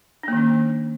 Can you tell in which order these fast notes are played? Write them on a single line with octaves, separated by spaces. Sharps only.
D4 A#3 D#3 C#4